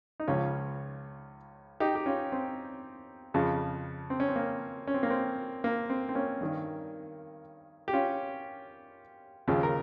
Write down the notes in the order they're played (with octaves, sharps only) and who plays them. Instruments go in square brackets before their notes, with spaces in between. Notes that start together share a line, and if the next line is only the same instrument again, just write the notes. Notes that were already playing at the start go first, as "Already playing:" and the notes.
[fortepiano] D#4
C#2 C#3 F3 C#4 F4
D#4 G4
G4
C#4 F4
C4
F2 C#3 F3
C4
C#4
C4
A#3
C#4
C4
A#3
C4
A#3
C4
C4
A#3 C#4
G2 D#3
G4
C#4 F4
D#2 C#3 F3
A#4